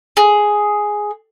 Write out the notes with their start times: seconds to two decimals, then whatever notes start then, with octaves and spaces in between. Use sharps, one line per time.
0.17 G#4